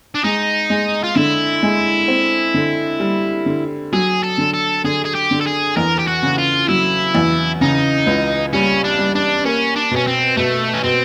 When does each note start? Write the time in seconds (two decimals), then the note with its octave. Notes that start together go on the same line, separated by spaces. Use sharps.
0.15 D4
0.24 G#3 D#4
0.70 G#3
1.04 F4
1.16 D3 E4
1.63 G#3
2.08 C4
2.54 D3
3.00 G3
3.46 D3
3.93 F#3 G#4
4.23 A4
4.38 D3
4.54 A4
4.84 D3 G#4
5.05 G#4
5.15 G4
5.31 D3
5.41 A4
5.46 G#4
5.76 E2 A#4
5.99 G4
6.07 F#4
6.23 C#3
6.38 F4
6.69 F#3 E4
7.15 E2
7.61 C#3 D#4
8.06 C#2
8.53 G3 C#4
8.84 D4
8.99 G3
9.15 D4
9.45 A#3 C#4
9.76 D4
9.91 B2 C#4
10.07 C4
10.37 B2 A3
10.74 C#4
10.84 B2 C4